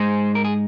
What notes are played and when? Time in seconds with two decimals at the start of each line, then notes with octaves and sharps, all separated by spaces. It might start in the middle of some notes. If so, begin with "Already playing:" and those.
Already playing: G#2 G#3 D#4 G#4 C5
0.35 A#4
0.44 G#4